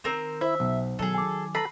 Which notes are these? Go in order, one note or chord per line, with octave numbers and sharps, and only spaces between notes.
D#3 C4 A#4 C5
E4 C5 E5
B1 B2
D#3 F#3 G#4 A4
G#5 D6
A4 B4 A#5 B5 C7